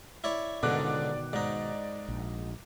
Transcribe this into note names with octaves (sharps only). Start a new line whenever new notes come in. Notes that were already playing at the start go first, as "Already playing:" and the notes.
E4 C#5 D5
C#2 G#2 B2 D3 D#3 D5 D6 F#6
G#2 D#4 D5
A#1